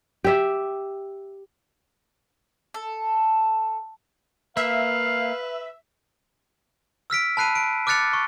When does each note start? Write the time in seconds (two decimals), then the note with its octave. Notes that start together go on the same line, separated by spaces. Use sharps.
0.24 G4 E5
2.74 A4
4.57 A#3 B4 E5 F5
7.10 E6 F6 B6 D7
7.37 A5 B5 F#6 C7 D#7
7.55 D7
7.87 D6 F6 F#6 A6 C#7 F7
8.13 C#6